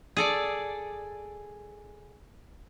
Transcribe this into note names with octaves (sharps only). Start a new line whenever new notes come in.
G#4 A4 D5